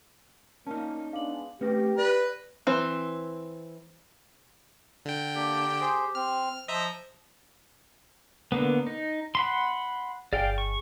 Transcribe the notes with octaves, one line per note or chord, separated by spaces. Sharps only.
A#3 C#4 D#4 A5 F6
G#3 B3 D4 F5 D6 F#7
A3 C4 C#4 G4 B4 F6 A#6
B4 D5 A#6
E3 C4
D3 G5
A#3 D4 G4
G#4 C5
C4 F6
F3 C5 D#5 E5 A#5
D3 A#3 B3
D#4
F#5 B5 C6
G1 G#4 D5 F5 G5
C#6